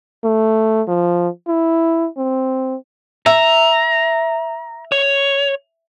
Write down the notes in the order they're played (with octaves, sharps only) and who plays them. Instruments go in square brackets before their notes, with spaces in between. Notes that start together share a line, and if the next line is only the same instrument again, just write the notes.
[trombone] A3
F3
E4
C4
[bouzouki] E5 [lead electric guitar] A#5
[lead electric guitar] C#5